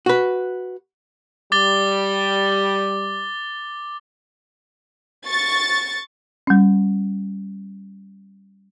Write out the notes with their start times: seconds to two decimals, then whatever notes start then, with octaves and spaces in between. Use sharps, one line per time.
0.06 F#4 B4
1.52 G3 D6 A6 G7
5.28 C#6 A6
6.47 G3 C#4